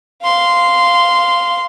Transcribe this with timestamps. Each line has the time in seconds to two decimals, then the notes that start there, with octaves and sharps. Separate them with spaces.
0.23 F5 C6